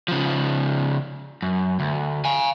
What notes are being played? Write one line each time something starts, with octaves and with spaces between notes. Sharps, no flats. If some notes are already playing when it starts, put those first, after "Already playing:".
C#3 F3
F#2
D2
F5 G#5